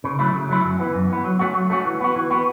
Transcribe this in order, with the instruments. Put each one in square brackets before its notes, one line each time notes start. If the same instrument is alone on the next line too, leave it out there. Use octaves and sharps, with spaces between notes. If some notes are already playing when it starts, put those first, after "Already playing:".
[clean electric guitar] C#3
F#3 A3 E4
C#3
F#3 A3 E4
F#2
E3 B3
F#2
E3 B3
F#3
A3 C#4 F#4
F#3
A3 C#4 F#4
E3
B3 F#4
E3
B3 F#4